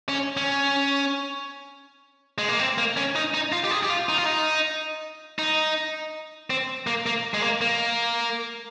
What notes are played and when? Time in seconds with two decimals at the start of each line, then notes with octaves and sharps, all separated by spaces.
0.09 C#4
0.37 C#4
2.38 G#3
2.49 A#3
2.60 C4
2.78 A#3
2.97 C#4
3.15 D#4
3.34 D#4
3.52 F4
3.64 G4
3.71 G#4
3.83 G4
3.90 F4
4.09 D#4
4.18 F4
4.26 D#4
5.39 D#4
6.50 C4
6.87 A#3
7.06 A#3
7.34 G#3
7.43 A#3
7.61 A#3